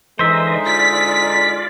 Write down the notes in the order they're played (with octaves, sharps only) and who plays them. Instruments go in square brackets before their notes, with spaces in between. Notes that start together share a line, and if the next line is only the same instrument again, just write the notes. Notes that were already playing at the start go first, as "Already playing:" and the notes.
[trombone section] D3 G#3 D#4 [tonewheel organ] E3 D#5 [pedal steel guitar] C5 E5
[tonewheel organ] F4 D5 [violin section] B6